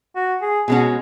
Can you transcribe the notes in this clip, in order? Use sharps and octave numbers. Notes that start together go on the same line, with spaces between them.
F#4
G#4
B2 G#3 C#4 F#4 G#4